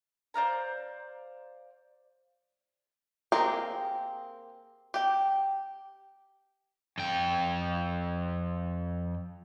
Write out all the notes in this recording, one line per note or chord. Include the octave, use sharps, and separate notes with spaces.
C5 D5 F5 A#5
A#3 C4 G4 G#4 A#4
G4 G5
F2 G5